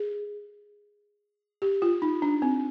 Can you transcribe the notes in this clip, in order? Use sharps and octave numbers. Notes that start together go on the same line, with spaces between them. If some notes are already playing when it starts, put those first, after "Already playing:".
Already playing: G#4
G4
F4
D#4
D4
C4